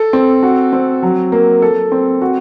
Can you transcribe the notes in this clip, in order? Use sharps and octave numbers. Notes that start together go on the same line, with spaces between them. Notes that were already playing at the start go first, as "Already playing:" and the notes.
Already playing: A4
C4
F#4
C4
F#3
A#3
A4
C4
F#4